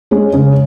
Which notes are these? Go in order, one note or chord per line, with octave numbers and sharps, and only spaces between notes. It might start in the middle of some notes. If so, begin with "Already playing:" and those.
G#3 C#4
C#3